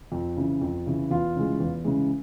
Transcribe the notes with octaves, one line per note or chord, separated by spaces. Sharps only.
F2
C#3 E3
F2
C#3 E3
E2 F4 F5
C#3 E3 G#3
E2
C#3 E3 G#3